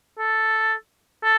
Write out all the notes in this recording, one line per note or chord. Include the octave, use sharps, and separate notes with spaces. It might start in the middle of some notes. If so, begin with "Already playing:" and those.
A4
A4